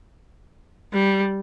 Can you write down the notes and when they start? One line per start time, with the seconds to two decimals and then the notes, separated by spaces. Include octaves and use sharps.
0.93 G3